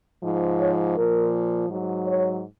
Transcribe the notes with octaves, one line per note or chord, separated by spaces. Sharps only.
G#2 F3
C#5
A#2 F3 A#4
G#2 F#3
C#5